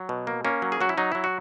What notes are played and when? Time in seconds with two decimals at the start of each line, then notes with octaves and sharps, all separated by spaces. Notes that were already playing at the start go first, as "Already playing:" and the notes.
Already playing: F#3
0.09 B2
0.27 A#3
0.45 A#3 C#4
0.62 F#3
0.72 G#4
0.81 F#3 F#4
0.89 E4
0.98 F#3 D#4
1.12 F#3 E4
1.24 F#4